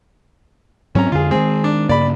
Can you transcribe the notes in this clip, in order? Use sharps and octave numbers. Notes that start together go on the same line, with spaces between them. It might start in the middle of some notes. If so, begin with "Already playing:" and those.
G#2 F#3 C4 C#4 A#5
F2 D3 F4 G#4
D#3 G#3 C4 G#4
D4
G2 C#3 A#3 D5 B5